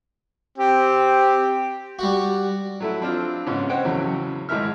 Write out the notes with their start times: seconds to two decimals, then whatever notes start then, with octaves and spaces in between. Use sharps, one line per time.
0.58 C4 G4
1.99 G3 F#4
2.80 F#3 A3 E4
3.01 F3 C4 D4 F4
3.46 G#2 C#3 B3 C#4
3.69 C5 C#5 D#5 F#5 G5
3.85 E2 A2 C#3 F#3
4.49 G#1 A2 G#3 A#4 E5 F6